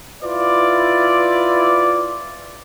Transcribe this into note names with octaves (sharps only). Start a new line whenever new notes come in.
E4 F4 B4 D5